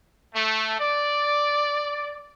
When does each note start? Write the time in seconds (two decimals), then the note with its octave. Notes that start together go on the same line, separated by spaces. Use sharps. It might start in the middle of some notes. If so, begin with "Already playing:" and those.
0.35 A3
0.79 D5